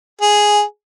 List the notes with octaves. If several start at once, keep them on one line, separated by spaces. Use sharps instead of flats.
G#4